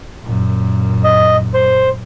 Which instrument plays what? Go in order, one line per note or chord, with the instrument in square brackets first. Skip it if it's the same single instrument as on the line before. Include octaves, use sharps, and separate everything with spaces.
[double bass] F#2 A#2
[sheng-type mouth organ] D#5
C5